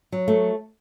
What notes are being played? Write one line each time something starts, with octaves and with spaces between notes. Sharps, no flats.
F#3
A3